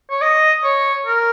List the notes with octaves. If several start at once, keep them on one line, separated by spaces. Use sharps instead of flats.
C#5
D#5
C#5
A#4